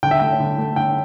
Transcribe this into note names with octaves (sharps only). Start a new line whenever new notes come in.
D3 G5
E5
A3 G5
D3
A3
D3 G5